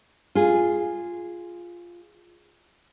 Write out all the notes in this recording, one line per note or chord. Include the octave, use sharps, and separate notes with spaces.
F4 G#4